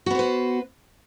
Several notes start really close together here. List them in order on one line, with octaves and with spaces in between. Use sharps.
F#4 B3 C5 B4